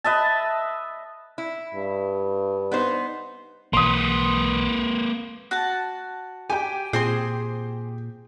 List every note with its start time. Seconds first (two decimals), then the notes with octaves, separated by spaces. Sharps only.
0.04 B4 D#5 E5 A5
1.38 E4
1.75 G2
2.71 B3 D#4 C5
3.73 B1 E3 A#3 B4 C6 D#6
5.51 F#4 A5
6.50 G4 G5 G#5
6.93 A#2 C4 G#4 C5 G#5 C6